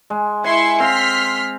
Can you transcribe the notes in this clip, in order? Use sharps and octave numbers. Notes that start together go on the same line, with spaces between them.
G#3
E4 G#5 C6 C#6
C4 F5 C6 F6 B6